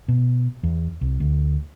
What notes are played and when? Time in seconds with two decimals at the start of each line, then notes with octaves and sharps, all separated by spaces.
0.08 B2
0.63 E2
1.01 C2
1.20 D2